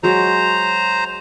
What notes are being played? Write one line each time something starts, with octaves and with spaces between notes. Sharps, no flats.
F#3 G#3 C5 A#5